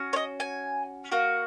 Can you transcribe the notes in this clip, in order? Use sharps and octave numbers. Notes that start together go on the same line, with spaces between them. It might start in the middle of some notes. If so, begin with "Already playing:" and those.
Already playing: C#4 F#4
C#5
D#5
G#5
A#3 F#4